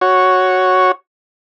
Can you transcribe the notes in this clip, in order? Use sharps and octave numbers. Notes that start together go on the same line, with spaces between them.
F#4 C#5